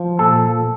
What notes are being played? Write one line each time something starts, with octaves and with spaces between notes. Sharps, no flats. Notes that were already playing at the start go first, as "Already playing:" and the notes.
Already playing: F3
A#2 A4